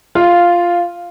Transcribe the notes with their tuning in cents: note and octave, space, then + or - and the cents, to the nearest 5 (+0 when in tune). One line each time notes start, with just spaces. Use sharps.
F4 +0 F5 +0